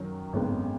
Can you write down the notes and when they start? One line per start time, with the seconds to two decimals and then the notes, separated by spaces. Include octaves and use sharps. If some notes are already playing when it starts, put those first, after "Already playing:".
Already playing: F#2 D#3 F#3 C#4
0.33 G#1 F#2 C#3 G#3 B3